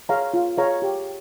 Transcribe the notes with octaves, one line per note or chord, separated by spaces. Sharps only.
G#4 C#5 F5 A#5
F4
G#4 C#5 F5 A#5
G4